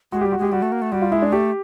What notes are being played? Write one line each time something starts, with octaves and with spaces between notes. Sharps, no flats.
G#3 F#4
G4
G3
F#4
G#3 G4
G3 F#4
A3
A#3
A3
G3 F#4
F4
G#3 E4
D4
A3 G4